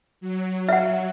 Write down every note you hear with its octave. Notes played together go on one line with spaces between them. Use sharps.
F#3
E5 F#5